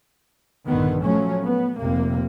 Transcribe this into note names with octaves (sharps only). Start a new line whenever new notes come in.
A#1 G2 D3 D#3 B3
F3 F#3 A3 C#4
B3
F1 C3 A#3